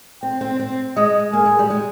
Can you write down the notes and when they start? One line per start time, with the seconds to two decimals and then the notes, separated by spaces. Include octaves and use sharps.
0.23 C4 G5
0.41 C4
0.60 C4
0.97 G#3 D#5
1.33 A#3 G#4
1.46 G#3
1.59 G3
1.70 G#3